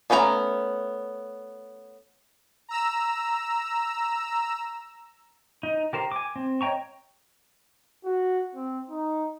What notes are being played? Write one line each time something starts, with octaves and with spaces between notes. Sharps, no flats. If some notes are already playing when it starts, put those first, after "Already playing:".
A3 B3 C#4 A#4 A#5
A#5 E6
D#4
G4 A#4 C5
G#5 D6
C4
C#5 D#5 G5 A#5 C#6
F#4
C4
D#4